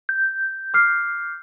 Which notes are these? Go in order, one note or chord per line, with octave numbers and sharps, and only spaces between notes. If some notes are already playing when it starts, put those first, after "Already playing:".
G6
D6 F6 C7